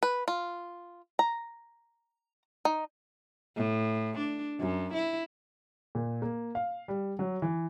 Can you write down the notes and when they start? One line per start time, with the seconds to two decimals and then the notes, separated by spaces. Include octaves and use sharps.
0.03 B4
0.28 F4
1.19 A#5
2.65 D#4
3.57 A2
4.18 D4
4.60 F#2
4.94 E4
5.95 A#2
6.22 A#3
6.55 F5
6.88 G3
7.19 F#3
7.42 E3